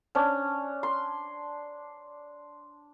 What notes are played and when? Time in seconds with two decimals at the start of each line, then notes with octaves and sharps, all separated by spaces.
0.15 C#4 D4
0.83 C6